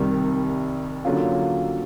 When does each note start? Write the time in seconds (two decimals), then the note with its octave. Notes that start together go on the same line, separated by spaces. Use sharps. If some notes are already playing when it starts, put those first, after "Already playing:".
Already playing: C2 C3 D#3 G3
1.05 D3 F#3 A#3 C#4 F4